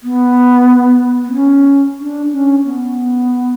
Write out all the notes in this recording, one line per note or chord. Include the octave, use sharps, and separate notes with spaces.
B3
B3
C#4
D4
C#4
B3